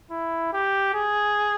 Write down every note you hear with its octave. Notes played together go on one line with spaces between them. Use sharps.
E4
G4
G#4